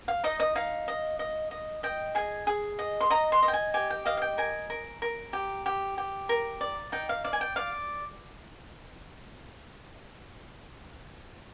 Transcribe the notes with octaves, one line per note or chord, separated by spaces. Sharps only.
F5
D#4 D#5
D#5
D#4 F5
D#5
D#5
D#5
D#5 G5
G#4 G#5
G#4
D#5
C6
D#5 A#5
C6
D#5
G5
G#5
G4 G#5
G5
D#5 F5
F5
G5
A#4 G#5
A#4
A#4
G4
G4
G4
A#4
D5
D#4 G5
F5
D5 F5
G#5
G5
D5 F5